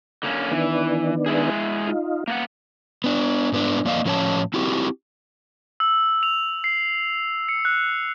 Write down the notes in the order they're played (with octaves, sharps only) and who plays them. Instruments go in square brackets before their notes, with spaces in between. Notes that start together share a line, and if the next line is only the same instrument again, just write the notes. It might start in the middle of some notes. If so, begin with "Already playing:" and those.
[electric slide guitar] D3 A#3 C#4
[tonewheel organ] D#3 B3 D4 [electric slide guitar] E3
[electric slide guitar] G#3 E4 G#4
[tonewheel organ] D#4 F4
[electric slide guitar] A#3 B3 F#5
B3 D4
G#2 B3 D4
F2 A#3 D5 D#5 F5
A2 F3 C#4 B4 C#5 A5
C4 E4 F#4 G4
[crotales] E6
F7
C7
C#7
F#6